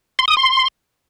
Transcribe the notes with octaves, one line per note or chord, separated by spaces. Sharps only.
C6
D#6
C6